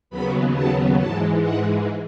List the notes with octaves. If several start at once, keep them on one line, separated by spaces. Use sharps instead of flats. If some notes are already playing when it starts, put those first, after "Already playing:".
D#2 C#3 F#3 B3 B5
A5
G#2 E3 G#3 A5
F#5